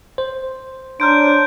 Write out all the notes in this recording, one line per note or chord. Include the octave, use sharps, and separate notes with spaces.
C5
D4 C#5 A#5 C6 F6 G6 D7